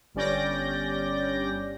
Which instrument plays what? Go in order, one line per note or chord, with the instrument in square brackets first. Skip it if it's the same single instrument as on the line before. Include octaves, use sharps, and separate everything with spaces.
[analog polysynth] G1 G3 C#4 D5 G6 A#6